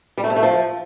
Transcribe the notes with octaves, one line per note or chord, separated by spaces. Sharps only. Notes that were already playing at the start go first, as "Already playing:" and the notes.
G3
A3
C3
A3
F3